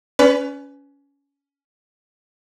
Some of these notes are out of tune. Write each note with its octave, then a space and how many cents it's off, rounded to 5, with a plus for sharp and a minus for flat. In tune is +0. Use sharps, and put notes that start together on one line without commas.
C#4 +20 B4 +20 D5 -30